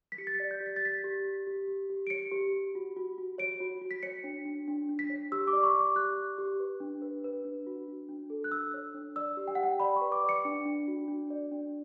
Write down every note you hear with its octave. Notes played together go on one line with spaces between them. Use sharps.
B6
G4 C#7
A6
B6
D5
G6
G4
B6
A6
G4 B6
G4
G4
G4
G4
G4
D7
C#5 C#7
G4
G4
F#4
F#4
F#4
C#5 D7
F#4
F#4
B6
C#5 C#7
D4
D4
D4
D4
B6
C#5
G4 E6
D6
D5
C#6
G4
D6
G4 F#6
G4
G4
B4
D4
B4
B4
D4
F#4
D4
D4
A4
F#6
D4 E6
C#5
D4
D5 E6
G4
G5
F#5
G4 G5
D5 B5
C#6
B4
D6
D5
C#7
D4
D4
F#4
D4
D5
D4